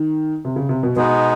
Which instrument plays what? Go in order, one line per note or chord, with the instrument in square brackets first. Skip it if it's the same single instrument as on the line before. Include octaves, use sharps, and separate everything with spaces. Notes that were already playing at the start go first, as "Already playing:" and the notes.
Already playing: [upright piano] D#3
C3
C#3
C3
B2
[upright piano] B2 [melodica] G#3 B3 D#4